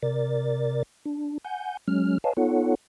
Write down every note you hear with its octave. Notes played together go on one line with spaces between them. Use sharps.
C3 A#4 D5 A6
D4
F#5 G#5 G6
F#3 G#3 C#4 F6
B4 C#5 D#5 F5 G#5 A5
B3 D#4 F4 A4 C#5 F#5